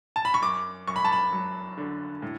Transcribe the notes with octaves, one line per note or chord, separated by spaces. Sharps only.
A5
B5
C#6
F#2 D6
F#2 C#6
B5
A5
B5
F#3
D3
A2